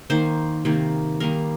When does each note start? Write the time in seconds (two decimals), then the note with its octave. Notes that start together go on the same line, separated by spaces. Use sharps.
0.10 D#3 A#3 C5
0.65 C3 D#3 A#3
1.20 D#3 G3 A#3 A#4